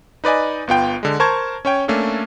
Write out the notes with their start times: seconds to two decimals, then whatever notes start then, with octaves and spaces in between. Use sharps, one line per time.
0.24 D#4 B4 D5 D#5 G#5
0.67 G1 B3 F4 G5
1.03 D3 G#3
1.20 A#4 C5 A5 C#6 G#6
1.65 C#4 C#5 G5
1.88 A3 A#3 C#4 D4 A4